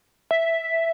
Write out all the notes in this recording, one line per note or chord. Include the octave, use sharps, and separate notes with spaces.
E5